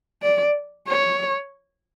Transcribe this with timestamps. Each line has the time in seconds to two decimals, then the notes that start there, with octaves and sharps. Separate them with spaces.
0.22 D5
0.88 C#5